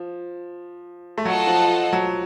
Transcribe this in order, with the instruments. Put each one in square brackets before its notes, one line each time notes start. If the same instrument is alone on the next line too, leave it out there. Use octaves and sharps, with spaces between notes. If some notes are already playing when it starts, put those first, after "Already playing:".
Already playing: [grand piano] F3
A3
[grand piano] F#3 [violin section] F4 A4 D#5 F#5 A5
[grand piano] F3
F#3